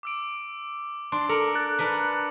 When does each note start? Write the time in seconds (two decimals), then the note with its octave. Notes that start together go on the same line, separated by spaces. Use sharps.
0.03 D6 E6 D7
1.12 D4 C6 D7
1.29 A4 A#4 D6 C#7 F#7
1.55 F#6 A6
1.79 D4 A#4 B4